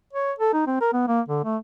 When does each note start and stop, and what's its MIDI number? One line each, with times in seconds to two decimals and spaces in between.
0.13 0.32 73
0.39 0.52 69
0.53 0.62 63
0.67 0.78 60
0.81 0.91 70
0.93 1.05 59
1.08 1.21 58
1.28 1.42 50
1.44 1.57 57